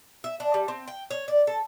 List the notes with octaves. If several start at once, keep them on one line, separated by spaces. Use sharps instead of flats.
E5
D4
G3
C4
G5
C#5
D5
A4